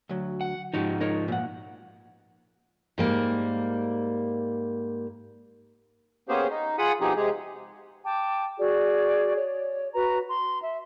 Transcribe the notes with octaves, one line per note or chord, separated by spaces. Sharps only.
D2 F#3
F#5
G#2 F3 D#4 F#4 G4
D#4 A#4 C#5
A#2 F#5
G#2 G3 A#3
A#3 B3 C#4 G4 G#4 C5
D#4
F4 G#4 F#5 B5 D#6
B2 F3 C4 D#4 G4 G#4
C3 G#3 G4 G#4
G5 A5 D6
F#4 G#4 D5
C#5
F#4 B4 A#5
C6
E5